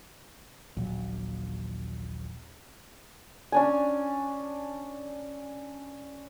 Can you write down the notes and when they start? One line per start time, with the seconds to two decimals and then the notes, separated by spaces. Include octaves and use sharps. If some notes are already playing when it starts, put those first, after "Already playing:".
0.77 D#1 A#1 F#3
3.52 C#4 D4 G#5